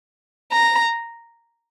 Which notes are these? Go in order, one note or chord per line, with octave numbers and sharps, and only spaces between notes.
A#5